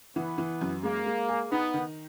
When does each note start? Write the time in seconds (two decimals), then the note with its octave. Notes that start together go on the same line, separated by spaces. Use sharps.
0.15 E3 B3
0.38 E3
0.61 F#2
0.83 G#3 A#3
1.06 G#3
1.29 G#4
1.52 B3 D#4
1.74 D#3